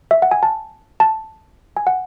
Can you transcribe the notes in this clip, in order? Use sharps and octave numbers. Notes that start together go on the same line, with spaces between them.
E5
F#5
G#5
A5
A5
G#5
F#5